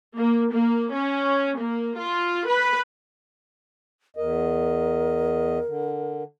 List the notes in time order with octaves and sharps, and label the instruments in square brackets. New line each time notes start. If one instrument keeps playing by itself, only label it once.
[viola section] A#3
A#3
C#4
A#3
F4
B4
[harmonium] E2 D#5 [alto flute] A#4
[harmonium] D3